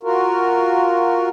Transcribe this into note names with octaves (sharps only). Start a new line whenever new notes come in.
F4 F#4 A#4